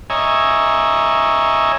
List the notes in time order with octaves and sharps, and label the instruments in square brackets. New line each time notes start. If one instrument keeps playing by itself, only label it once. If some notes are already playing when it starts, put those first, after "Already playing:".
[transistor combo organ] C#5 D#5 E5 G#5 A#5